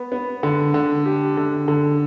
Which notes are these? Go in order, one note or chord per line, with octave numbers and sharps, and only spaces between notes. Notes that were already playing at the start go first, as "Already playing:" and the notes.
Already playing: B3
B3
D3
D3
G4
D3
D3